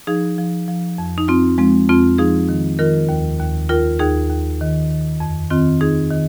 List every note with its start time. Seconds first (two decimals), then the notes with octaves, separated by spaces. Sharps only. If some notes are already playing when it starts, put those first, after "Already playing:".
0.07 F3 D#4 G#4
0.38 F3
0.68 F3
0.98 F2
1.18 D#4
1.28 F2 C4 F4
1.58 F3 G#3 C4
1.89 F2 C4 F4
2.18 F3 D#4 G#4
2.49 D#3
2.79 D#3 F4 A#4
3.09 D#2
3.40 D#2
3.69 D#2 F4 A#4
3.99 D#2 D#4 G#4
4.30 D#2
4.61 D#3
4.91 D#3
5.20 F2
5.50 D#3 C4 F4
5.81 D#3 D#4 G#4
6.10 D#3